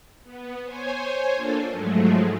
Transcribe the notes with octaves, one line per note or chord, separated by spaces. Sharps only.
B3
C5 C#5 G#5
A#3 D4 F4 A4
G#2 F3 F#3 G#3 A3